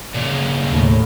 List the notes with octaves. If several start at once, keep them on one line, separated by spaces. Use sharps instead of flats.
A#2 C#3
D#2 A2